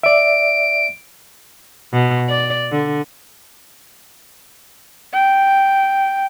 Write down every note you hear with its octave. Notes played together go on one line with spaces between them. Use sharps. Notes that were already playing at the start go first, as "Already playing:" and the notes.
D5 E5 D7
B2
D5
D3
G5